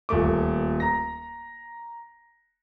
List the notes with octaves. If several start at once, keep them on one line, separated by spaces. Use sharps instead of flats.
D#1 A#2 A3 D6
A#5 A#6